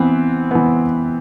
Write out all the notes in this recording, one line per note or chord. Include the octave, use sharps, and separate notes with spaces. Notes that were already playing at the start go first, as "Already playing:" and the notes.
Already playing: E3 B3 C4
E3 B3